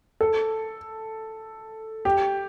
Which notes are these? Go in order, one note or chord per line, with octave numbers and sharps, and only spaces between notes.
A4
G4